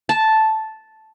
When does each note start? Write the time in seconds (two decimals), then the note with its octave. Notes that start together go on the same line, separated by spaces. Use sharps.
0.09 A5